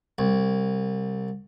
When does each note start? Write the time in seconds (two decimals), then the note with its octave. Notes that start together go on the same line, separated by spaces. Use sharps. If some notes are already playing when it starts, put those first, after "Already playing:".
0.18 C2